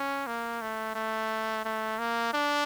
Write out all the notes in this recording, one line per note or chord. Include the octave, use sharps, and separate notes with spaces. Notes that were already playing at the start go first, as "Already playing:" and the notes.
Already playing: C#4
A#3
A3
A3
A3
A#3
D4